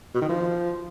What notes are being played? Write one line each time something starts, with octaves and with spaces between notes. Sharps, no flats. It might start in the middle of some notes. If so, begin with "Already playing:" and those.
B2
D#3
F3